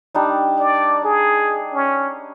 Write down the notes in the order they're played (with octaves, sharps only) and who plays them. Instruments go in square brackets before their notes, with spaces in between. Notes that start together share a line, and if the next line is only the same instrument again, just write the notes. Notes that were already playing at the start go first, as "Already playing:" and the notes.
[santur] G3 D4 D#4
[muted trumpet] D5
G#4
C#4